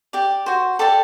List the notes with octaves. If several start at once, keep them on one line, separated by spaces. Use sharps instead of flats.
G4 D5
F#4 C5
G4 A4 D5 A5